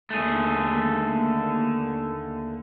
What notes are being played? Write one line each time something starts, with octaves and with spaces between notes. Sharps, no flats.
D#2 D3 A3 G#4